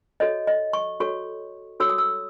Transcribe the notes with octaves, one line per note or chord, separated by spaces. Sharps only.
F#4 A4 C#5 D#5
D#5
C#6
F#4 A4 C#5 C#6
F#4 A4 C#5 E6
D#6
E6